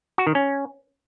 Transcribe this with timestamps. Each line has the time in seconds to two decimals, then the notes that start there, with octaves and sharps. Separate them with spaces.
0.18 F#4
0.27 D#3
0.35 C#4